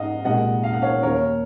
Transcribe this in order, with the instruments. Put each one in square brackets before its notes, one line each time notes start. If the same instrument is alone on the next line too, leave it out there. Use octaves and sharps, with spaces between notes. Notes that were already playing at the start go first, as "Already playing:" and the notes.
Already playing: [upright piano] G#2 G#3 D#5 F5 F#5
C2 A#2 G#3 D#5 F#5
F5
F#5
C#5 F5
D#2 D#3 A#3 A#4 C#5